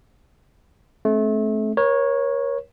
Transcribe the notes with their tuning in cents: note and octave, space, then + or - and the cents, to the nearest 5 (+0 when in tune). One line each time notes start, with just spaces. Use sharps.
A3 -30 C4 +35
A#4 +35 C#5 -10